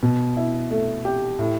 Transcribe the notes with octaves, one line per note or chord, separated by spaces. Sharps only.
B2
E4
A3
G4
A2